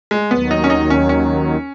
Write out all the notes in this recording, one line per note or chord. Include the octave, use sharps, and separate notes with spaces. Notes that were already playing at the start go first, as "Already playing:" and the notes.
G#3
D#2 D#3 F#3 B3
D#4
C#4
D#4
C#4
C#4